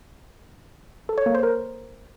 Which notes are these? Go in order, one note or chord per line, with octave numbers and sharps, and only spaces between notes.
A4
C#5
A#3
C5
A#4